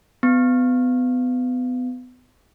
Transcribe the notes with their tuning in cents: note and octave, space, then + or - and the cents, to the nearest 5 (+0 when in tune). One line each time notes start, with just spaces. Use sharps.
B3 +30